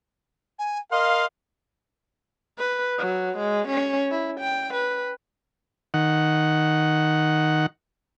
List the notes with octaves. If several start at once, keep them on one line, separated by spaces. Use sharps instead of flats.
G#5
A#4 D#5 F5 C6
B4
F#3
G#3
C#4
E4
G5
B4
D#3 F#5